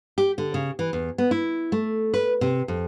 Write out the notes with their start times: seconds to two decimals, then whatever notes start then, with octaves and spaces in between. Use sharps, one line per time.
0.18 G4
0.38 D3
0.54 C#3
0.79 E3
0.93 E2
1.18 B3
1.31 E4
1.72 A3
2.14 B4
2.41 C3
2.68 F2